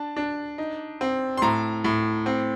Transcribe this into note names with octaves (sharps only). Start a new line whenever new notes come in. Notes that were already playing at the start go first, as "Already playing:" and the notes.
Already playing: D4 A5
D4
D#4
C4
C6
A2 A#5
A2
C4